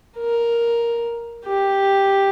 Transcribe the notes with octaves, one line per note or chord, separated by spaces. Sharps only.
A#4
G4